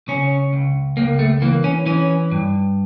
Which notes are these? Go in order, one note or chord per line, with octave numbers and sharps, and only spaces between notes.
C#3 C#4
C#2
C#2 A#3
A3
E3 A#3
C#4
E3 C#4
G2